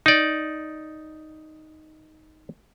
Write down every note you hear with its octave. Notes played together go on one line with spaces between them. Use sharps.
D#4 D5